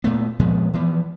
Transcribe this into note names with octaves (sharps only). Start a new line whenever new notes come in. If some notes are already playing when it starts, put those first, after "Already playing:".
A#2 A3 B3
A#2 F3 G#3 B3
E3 F3 B3